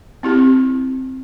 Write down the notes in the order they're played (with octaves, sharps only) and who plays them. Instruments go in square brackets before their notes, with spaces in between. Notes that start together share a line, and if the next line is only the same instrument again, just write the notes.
[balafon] C4 E4 G4